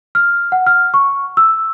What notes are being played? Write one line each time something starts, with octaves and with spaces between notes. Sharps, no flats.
F6
F#5
F6
C#6
E6